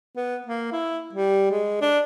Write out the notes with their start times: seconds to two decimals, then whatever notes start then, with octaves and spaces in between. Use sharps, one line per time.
0.16 B3
0.46 A#3
0.72 E4
1.13 G3
1.51 G#3
1.81 D4